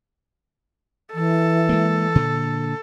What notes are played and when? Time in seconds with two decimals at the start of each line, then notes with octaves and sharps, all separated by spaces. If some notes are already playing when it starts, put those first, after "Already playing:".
1.14 E3 A4
1.69 G#3 A#3
2.15 A#2 D3